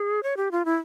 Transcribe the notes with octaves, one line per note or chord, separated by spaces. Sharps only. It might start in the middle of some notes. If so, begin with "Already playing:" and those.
Already playing: G#4
C#5
G4
F4
E4